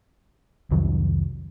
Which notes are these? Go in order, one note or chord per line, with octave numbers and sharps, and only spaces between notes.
C2 F2 D#3 F#3